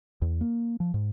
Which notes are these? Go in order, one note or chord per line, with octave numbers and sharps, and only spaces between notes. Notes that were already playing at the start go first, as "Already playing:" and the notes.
E2
A#3
F3
G#2